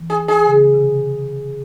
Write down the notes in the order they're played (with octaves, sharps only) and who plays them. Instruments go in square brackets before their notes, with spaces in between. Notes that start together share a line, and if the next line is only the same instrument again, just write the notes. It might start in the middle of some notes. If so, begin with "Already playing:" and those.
Already playing: [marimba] E3
[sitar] G#4
G#4
[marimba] C#3
C3